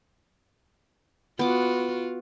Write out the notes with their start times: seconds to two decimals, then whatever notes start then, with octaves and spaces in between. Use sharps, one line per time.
1.39 B3 F4 F#4 D6